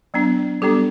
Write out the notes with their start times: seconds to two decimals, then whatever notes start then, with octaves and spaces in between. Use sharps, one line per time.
0.14 F#3 B3 D4
0.62 G3 B3 D4 G4 A4